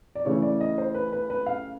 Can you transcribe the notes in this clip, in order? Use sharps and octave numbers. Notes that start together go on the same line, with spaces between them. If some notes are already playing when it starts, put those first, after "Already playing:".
D5
C#3 E3 A3 C#5
D5
D#5
C5
B4
B4
B4
F5